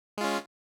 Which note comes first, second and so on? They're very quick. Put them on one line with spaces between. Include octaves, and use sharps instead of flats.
G#3 F4 C#4